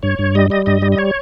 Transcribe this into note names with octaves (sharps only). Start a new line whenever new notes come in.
G2 C#5
G2
G3 D#5
G3 D#5
G2 D#5
G3
D#5
C#5